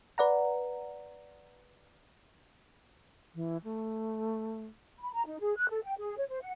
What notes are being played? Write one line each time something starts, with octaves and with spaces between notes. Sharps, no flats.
B4 D5 F#5 A#5
E3
A3
B5
A#5
D#4
G#4
F#6
A4
G5
G#4
C#5
C5
F#5